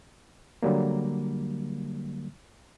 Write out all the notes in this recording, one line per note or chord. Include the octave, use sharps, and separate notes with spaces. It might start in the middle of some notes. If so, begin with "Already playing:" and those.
D3 F#3 G3 A#3